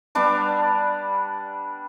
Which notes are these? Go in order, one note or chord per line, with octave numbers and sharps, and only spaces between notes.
G3 B3 D4 D6